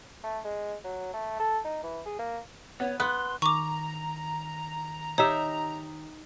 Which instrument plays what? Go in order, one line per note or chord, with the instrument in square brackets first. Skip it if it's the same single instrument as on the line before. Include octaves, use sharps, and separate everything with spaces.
[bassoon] A3
G#3
F#3
A3
A4
D#4
E3
G#4
A#3
[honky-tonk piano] B3 [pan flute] C#5
[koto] B3 [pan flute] C6 [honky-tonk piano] F#6
[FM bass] D#3 [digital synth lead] A#5 [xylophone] C#6 D6
[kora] D#4 G4 E5 [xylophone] C#5